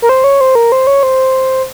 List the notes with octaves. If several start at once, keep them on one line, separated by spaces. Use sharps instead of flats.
A#4
C5
C#5
C5
A#4
C5
C#5
C5